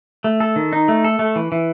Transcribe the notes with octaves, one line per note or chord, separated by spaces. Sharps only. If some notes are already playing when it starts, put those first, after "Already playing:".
A3
A4
D#3
D#4
A3
A4
A3
E3
E3